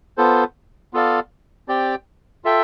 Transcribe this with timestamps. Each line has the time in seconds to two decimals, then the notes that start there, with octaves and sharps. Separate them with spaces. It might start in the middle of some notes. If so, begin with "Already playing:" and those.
0.17 B3 F4 A4 C5
0.93 B3 F4 A4 D5 F5
1.68 C4 G4 D5 G5
2.45 F4 A4 E5 G5